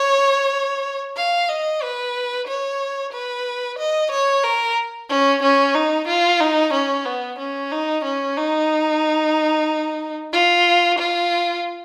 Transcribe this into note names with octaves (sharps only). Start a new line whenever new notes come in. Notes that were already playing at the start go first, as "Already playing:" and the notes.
Already playing: C#5
F5
D#5
B4
C#5
B4
D#5
C#5
A#4
C#4
C#4
D#4
F4
D#4
C#4
B3
C#4
D#4
C#4
D#4
F4
F4